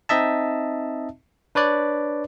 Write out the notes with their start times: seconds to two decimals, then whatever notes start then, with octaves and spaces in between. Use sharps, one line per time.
0.09 C4 D#4 D#5 E5 A5
1.55 D4 B4 C#5 D5